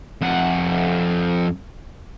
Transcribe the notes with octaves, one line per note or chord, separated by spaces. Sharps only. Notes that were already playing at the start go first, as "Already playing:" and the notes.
F2 F#5